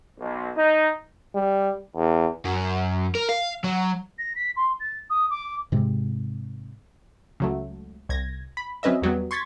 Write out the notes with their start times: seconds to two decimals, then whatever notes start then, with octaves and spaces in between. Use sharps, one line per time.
0.19 B1
0.56 D#4
1.35 G3
1.96 E2
2.45 F#2
3.15 A#4
3.29 F5
3.64 F#3
4.18 A#6
4.35 B6
4.56 C6
4.80 A6
5.10 D#6
5.30 D6
5.72 G#2 C3 G#3
7.40 C#2 F#3 A3
8.09 C2 G#6 A#6
8.57 B5
8.83 F#3 C4 C#4 B4 D#5 E5
9.02 E2 F#3 G3 B3
9.31 C6 C#6 G#6 A6 B6